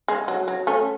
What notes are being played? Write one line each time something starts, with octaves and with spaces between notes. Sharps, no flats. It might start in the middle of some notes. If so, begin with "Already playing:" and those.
G#3
F#3
F#3
A3 C#4